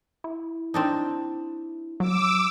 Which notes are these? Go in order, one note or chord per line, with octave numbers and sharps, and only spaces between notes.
E4
C4 D4 D#4
F#3 D6 E6